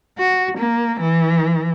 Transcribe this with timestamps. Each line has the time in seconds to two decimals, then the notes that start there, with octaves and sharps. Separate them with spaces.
0.19 F#4
0.58 A#3
1.01 E3